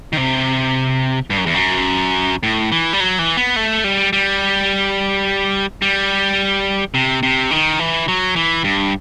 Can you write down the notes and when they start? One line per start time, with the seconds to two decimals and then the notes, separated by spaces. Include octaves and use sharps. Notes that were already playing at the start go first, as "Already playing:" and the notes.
0.13 D#3
0.17 C3
1.30 G2
1.38 F#2
1.46 E2
1.54 F#2
2.43 A2
2.72 E3
2.93 G3
3.00 F#3
3.19 E3
3.37 B3
3.56 A3
3.84 G3
4.13 G3
5.82 G3
6.94 C3
7.23 C3
7.51 D#3
7.79 E3
8.08 F#3
8.36 E3
8.64 G2